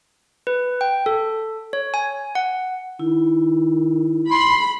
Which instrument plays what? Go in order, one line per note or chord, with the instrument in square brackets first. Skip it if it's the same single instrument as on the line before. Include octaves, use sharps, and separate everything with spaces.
[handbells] B4
G5
A4
C#5
G#5
F#5
[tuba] D#3 [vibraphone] E4
[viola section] B5 [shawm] C6